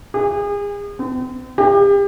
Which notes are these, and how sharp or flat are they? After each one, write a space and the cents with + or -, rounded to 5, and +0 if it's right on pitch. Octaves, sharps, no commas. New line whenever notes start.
G#4 -35
C4 -40
G4 +35